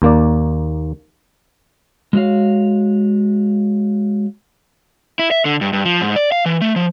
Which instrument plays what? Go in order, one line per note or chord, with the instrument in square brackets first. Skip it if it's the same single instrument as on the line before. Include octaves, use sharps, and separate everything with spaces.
[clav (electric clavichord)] D#2 A#3 D5
[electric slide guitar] G#3 A3 F#4 C#5 F5
[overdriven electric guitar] E4
E5
D3
G2
G2
F3
G#2
D5
F5
E3
A3
F3